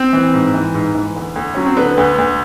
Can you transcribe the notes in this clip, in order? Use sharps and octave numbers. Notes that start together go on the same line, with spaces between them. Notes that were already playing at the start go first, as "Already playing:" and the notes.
Already playing: C4
E3
G#2
E3
G#2
E3
D2
D2
F#3 C#4
C4
D3 B3
D2
D2